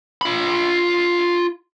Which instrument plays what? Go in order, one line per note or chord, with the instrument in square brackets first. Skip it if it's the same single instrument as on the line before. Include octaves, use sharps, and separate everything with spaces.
[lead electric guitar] F4 B5